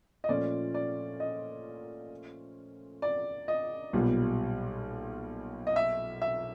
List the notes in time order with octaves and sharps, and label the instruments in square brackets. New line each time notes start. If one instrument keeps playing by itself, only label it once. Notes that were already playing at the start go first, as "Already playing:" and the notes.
[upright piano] D#5
[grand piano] A#2 F3 A3 C#4 F4 [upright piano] D5
[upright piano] D5
D#5
D5
D#5
[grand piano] B1 A#2 G3 B3
[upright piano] D#5
E5
E5